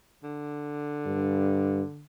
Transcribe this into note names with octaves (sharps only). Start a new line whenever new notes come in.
D3
G2